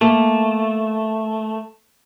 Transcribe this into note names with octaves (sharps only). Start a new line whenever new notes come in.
A3 A#3